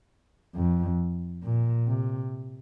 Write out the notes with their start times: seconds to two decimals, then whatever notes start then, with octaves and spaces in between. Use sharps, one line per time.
0.56 F2
1.43 A#2
1.88 C3